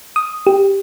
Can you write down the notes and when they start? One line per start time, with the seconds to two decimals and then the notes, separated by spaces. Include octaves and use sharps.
0.16 D#6
0.47 G4